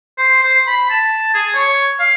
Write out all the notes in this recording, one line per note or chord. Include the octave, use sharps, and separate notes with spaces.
C5
C5
B5
A5
G#4
C#5
F5